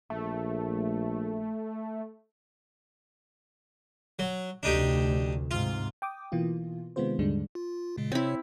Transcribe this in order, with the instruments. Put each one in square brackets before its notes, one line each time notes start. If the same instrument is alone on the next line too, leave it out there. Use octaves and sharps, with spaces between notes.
[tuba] A#1 [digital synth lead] A3
[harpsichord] F#3
[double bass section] F1 D2 [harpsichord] D4 D#4 G4
[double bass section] G#2 C3 [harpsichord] F4
[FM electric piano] G5 D6 D#6
B2 E3 A#3 F4
C3 D#3 G#3 B3 F4 C5
D#2 G#2 D3 G3 G#3 D4
[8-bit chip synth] F4
A#2 C#3 G#3
[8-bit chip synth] C3 C#5 [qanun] C4 E4